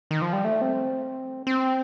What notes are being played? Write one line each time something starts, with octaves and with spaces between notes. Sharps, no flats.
D#3
F3
G3
A3
C4
C4